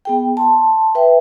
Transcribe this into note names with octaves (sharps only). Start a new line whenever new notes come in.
B3 G#4 G5
A5 C6
B4 E5 G5